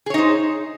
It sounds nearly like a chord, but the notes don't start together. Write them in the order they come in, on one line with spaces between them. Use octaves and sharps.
G#4 C#5 D#4 C5